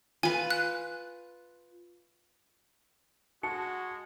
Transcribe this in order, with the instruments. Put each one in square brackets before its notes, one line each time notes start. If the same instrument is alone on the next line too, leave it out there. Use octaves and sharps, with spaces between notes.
[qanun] F4 B4 [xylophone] G#5
[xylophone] F#6
[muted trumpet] G#3 [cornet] F#4 [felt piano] A5 [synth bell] C#7